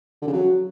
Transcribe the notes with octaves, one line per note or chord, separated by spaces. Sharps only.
D3
C#3
F#3